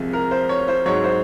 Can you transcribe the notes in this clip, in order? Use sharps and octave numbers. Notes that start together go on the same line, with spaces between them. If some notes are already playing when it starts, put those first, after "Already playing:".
Already playing: C2 C3 F3 G#3
A#4
C5
C#5
C5
G#2 F#3 C#5
C5